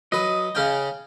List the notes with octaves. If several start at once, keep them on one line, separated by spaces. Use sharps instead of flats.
F#3 B4 D#5
C#3 C#4 G5